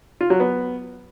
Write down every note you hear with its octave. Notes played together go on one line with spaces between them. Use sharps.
F4
F#3
B3